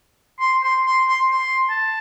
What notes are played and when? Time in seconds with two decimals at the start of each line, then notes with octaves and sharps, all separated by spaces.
0.40 C6
0.63 C6
0.86 C6
1.08 C6
1.31 C6
1.70 A5